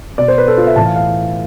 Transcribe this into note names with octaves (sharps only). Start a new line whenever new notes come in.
B2 D5
C5
B4
A4
F4
E5
A2 E3 A5
F5
F5